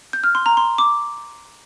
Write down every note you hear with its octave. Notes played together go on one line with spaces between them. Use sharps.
G6
F6
C6
A#5
C6
D6